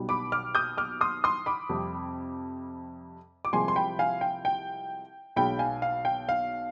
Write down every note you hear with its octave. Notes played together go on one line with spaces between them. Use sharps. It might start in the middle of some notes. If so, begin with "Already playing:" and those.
Already playing: B1 B2 G3
B5 D6
D6 F6
D#6 G6
D6 F6
C6 D#6
C6 D#6
B5 D6
F2 C3 G3
D6
C2 C3 F3 G#3 G#5 C6
C6
G5 B5
F5 G#5
G5
G5
B1 B2 G#3 G5 B5
F5 G#5
F5
G5
F5